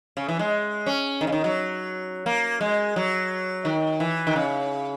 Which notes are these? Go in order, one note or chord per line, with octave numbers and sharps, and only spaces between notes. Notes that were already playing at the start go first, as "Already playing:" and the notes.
C#3
E3
G#3
C#4
D#3
C#3
D#3
F#3
A#3
G#3
F#3
D#3
E3
D#3
C#3